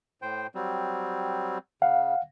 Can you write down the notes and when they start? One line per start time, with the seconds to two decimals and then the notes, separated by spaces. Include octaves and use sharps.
0.22 A2 C5 G5
0.55 F#3 G3 C4
1.82 C#3 F5 F#5